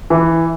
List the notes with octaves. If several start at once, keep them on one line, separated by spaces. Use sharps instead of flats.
E3